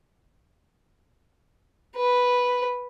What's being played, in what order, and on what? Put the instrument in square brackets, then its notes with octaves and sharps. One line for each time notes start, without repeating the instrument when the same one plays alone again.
[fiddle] B4